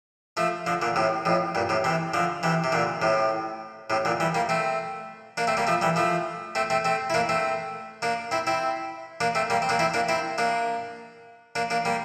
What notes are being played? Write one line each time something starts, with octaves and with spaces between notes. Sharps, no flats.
F3 A3
D3 F3
A#2 D3
A2 C3
F2 A2
G2 A#2
A2 C3
C3 E3
D3 F3
C3 E3
C3
A#2 D3
A2 C3
A2 C3
A#2 D3
E3 G3
G3 A#3
A3 C4
A#3 D4
A3 C4
G3 A#3
F3 A3
E3 G3
F3 A3
A3 C4
A3 C4
A3 C4
E4
A#3 D4
A3 C4
A#3 D4
C4 E4
C4 E4
A#3 D4
A3 C4
G3 A#3
C4
A#3 D4
C4 E4
A#3 D4
C4 E4
A#3 D4
A#3 D4
A#3 D4
G3 A#3